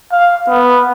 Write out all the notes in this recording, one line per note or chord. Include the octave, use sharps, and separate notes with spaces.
F5
B3